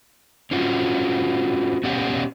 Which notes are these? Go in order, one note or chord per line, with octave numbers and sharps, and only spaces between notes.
C4 C#4 F4 F#4
B2 C#4 G4 D5 F#5